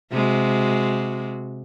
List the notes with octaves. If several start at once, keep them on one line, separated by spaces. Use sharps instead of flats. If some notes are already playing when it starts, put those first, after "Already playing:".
C3 G#3 F#4